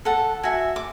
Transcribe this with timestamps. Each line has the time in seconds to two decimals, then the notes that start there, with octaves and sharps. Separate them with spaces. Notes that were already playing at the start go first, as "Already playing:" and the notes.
0.05 A4 F#5 A5
0.43 F#4 E5 G#5
0.76 D6